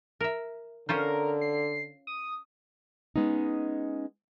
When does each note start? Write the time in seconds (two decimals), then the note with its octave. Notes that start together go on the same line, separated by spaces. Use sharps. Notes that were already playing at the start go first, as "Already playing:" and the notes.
0.21 A#4 E5
0.89 D3 C#4 F4 A#4 C5
1.41 C7
2.07 D#6
3.16 G#3 B3 C#4 D#4